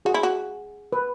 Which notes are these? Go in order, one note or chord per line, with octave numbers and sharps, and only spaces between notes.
F#4 G#4
E4
F#4
B4